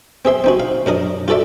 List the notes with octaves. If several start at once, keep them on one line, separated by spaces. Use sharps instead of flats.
C4 G#4 E5 C6
C4 D#4 F#4
F5
F#2 D4 A#4 D#5
F4 F#4 A4 D5 E5